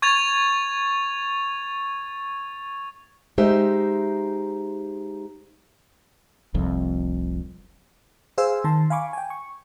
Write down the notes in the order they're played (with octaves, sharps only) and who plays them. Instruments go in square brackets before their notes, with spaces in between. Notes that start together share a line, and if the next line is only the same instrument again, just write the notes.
[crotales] C#6 G#6 A6 F7
[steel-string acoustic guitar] G#3 D#4 G4 C5 E5
[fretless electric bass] F1 C2 F2
[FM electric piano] G#4 C5 F5 G#5 E6
D#3 A5 C6
F5 G#5 B5 C#6 D6
G5 G#5
C#6